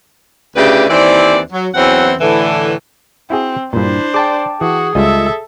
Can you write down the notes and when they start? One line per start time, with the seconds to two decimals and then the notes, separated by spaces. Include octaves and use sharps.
0.55 D2 C#3 E4 G4 B4 D5
0.90 D#2 E3 C4 C5 D5
1.52 F#3
1.74 E2 E3 F#3 C4 C#4 F#5
2.20 A2 D3 E3
3.30 C4 E4 F#4 G#4
3.73 G2 A#2 D4 E4 C5
4.14 G#4 D5 G5 A5 D6
4.61 E3 F#4 G#4
4.95 C#2 G3 G#3 F4 A4 D#5 E5